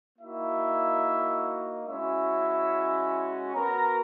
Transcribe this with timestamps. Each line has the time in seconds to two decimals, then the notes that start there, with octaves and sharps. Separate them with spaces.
0.19 A#3 D#4 E4 F#4 E5
1.87 G#3 C#4 E4 F#4 E5
3.54 B3 F#4 A#4 A#5